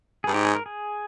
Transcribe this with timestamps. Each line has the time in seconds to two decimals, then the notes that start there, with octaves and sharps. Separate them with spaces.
0.24 G2 G#4
0.34 G#2 G4
0.44 G#4
0.55 A#4
0.66 G#4